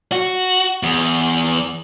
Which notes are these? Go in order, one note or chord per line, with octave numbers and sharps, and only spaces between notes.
F#4
E2